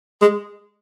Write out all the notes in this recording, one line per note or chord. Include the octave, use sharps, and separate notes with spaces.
G#3